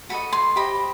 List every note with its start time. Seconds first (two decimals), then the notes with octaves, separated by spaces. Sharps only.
0.09 F#4 A4 D#5 B5
0.32 C6
0.56 G4 C5 D#5 B5